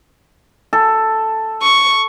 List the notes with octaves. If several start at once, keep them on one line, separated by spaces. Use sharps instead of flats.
A4
C#6